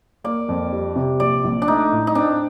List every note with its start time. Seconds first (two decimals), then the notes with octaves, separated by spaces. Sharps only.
0.24 A#3 D5
0.49 F2
0.72 G3
0.96 C3
1.20 A#1 D5
1.44 A#1
1.62 D4
1.68 A3 D#4
1.92 A2
2.07 D#4
2.15 C4 D4